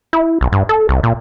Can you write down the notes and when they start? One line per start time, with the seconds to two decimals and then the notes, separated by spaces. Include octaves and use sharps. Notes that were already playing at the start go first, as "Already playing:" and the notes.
0.13 E4
0.41 B1
0.52 G2
0.69 A4
0.89 C2
1.03 A#2